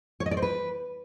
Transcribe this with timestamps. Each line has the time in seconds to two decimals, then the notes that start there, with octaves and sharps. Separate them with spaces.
0.20 C#5
0.26 D#5
0.31 D5
0.37 C5
0.42 B4